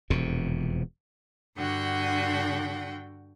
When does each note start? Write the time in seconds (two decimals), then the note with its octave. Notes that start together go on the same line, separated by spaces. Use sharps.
0.10 E1 F2 C3
1.57 G2 D3 F#4 F#5 G5